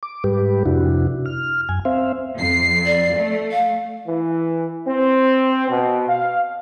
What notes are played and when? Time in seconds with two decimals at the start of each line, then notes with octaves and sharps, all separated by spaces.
0.03 D6
0.24 G#2 G3 G4 B4
0.66 F2 C3 D4 E4 F#4
1.26 F6
1.69 F#2 G#5
1.85 C4 C5 E5 F5
2.37 F2 C7
2.86 D5
3.15 A3
3.51 F5
4.07 E3
4.86 C4
5.69 B2
6.08 F5